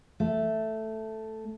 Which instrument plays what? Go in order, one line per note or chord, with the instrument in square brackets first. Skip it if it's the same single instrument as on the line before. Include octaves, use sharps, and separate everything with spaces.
[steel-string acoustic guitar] A3